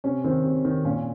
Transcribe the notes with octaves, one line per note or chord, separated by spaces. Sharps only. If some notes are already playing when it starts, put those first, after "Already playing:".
C3 C#4
D#3 C4
C3
D#3
A#2 C#4